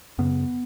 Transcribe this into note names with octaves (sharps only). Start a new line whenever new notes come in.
F#2 C#3 B3